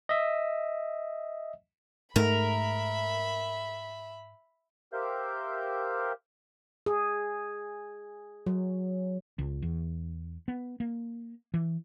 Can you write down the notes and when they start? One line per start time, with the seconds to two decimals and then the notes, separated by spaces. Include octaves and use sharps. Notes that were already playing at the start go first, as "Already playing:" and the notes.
0.09 D#5 E5
2.16 G#2 A3 A#4 E5 B5
4.93 G4 A#4 C5 E5 F5 G6
6.86 G#4
8.46 F#3
9.39 C#2
9.62 E2
10.48 B3
10.80 A#3
11.54 E3